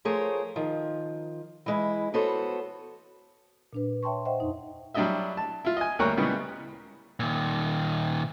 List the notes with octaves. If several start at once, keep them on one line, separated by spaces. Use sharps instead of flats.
F3 A3 G#4 A#4 C5 C#5
D#3 F3
E3 G#3 E4
B3 F#4 A4 C5 C#5
A#2 D4 B4
C#5 E5 G5 A5 C6 C#6
C5 D#5 E5 F#5 G5
F2 D#4
F#3 G3 D4 E4 D#5 E5
A5
E4 F4
D#5 G#5
D2 G3 A#3 A#4 C#5 F#6
A#2 C#3 E3 G3 G#3 B3
A#2 D#3